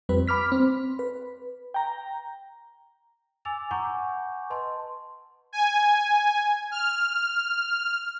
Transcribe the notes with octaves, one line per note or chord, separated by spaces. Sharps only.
F2 G3 C4 B4
B5 D6 F6 B6
C4
B4
G5 A#5
G#5 D6 E6 A6 F7
F#5 G#5 A#5 C#6 D6 G6
B4 D#5 A5 C6
G#5
F6